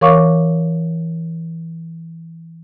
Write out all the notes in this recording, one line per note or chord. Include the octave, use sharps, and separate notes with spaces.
E3 A#4 C#5 F5 C#6 D6